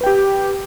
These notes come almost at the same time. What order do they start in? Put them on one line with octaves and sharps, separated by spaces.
B4 G5 G4